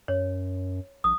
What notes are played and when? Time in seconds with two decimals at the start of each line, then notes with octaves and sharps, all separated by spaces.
0.08 F#2 C#5
1.04 A#1 D#6